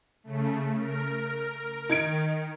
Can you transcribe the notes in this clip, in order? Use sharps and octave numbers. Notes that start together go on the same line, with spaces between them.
C#3 A3
A#4
D#3 D#4 G#6 D7